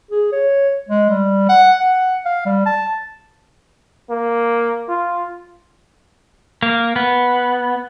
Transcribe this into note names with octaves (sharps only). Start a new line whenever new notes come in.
G#4
C#5
G#3
G3
F#5
F#5
F5
G3
A5
A#3
F4
A#3
B3